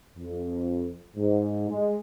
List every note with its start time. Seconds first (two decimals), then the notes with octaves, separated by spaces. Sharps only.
0.16 F2
1.16 G#2
1.70 G#3